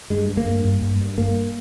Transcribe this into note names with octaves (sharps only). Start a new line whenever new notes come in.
G2 G#3
G2
A#3
G2
G2
G2
G2
G2 A#3